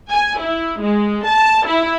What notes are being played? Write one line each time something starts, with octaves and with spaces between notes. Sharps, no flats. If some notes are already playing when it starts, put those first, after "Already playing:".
G#5
E4
G#3
A5
E4